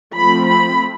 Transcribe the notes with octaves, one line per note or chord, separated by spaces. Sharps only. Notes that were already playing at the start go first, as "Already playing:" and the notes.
F3 A3 C4 B5
B5